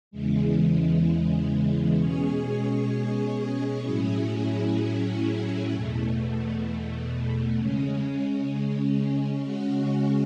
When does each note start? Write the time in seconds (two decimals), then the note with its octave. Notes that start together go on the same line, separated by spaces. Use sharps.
0.11 E2 C#3 E3 G#3
1.97 B2 G#3 C#4 G#4 C#5
3.83 A2 F#3 C#4 E4 G#4
5.69 E2 B2 A3
7.55 C#3 G#3 C#4
9.41 C#3 G#3 C#4 F#4